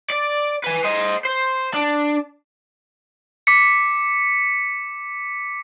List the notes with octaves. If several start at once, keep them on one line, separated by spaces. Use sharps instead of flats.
D5
B4 G#5
C5 D#5
C5
D4
D6 B6 C#7